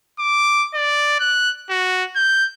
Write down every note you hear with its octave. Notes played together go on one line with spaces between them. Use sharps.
D6
D5
F#6
F#4
G6